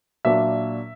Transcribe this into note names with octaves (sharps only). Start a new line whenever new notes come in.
A#2 F#3 A#3 D4 E5